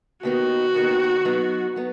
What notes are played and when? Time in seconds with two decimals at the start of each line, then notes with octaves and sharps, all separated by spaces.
0.23 D#2 D#3 B3 D#4 F#4
0.74 D#2 D#3 B3 D#4
1.25 F#3 B3 D#4
1.76 F#3 B3